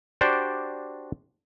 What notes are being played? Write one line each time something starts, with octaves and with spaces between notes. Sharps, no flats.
D4 F#4 G4 C5 D5